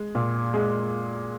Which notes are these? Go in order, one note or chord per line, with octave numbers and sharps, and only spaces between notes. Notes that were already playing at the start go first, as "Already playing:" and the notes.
Already playing: G#3
A#2
G#3